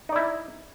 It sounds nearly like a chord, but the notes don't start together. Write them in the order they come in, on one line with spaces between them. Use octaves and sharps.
D#4 D5 E4